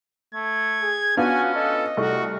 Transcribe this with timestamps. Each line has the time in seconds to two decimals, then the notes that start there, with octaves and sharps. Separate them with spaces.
0.35 A3 G#6
0.81 G#4
1.17 B3 C#4 D4 F4 F#4 G#5
1.55 A4 D#5
1.97 C2 A3 F#4 C#6